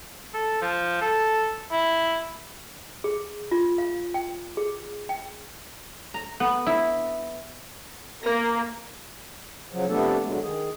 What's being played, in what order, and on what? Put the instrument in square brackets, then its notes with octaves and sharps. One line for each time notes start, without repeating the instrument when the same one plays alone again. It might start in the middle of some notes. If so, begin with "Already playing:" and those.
[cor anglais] A4
F3
A4
E4
[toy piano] G#4
F4
F5
G5
G#4
G5
[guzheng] A#5
B3
E4
[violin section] A#3 [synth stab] A#4 A#6
[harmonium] C#3 F3 F#3
C3 F3 A3 B3 D4 A4
G2 D3 F#3 G#3
D#3 G#4